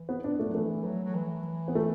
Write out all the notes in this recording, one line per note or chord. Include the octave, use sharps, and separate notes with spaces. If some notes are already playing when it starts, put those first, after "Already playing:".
Already playing: E3
B3
D4
A3
F#3
E3 A3
F#3
F#3
E3
B3
A3